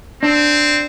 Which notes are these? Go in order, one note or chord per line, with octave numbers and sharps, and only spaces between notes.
C4 D4